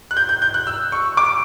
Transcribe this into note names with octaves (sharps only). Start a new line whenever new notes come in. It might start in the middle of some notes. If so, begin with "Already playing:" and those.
F#6
G6
G6
G6
F#6
E6
C#6
D6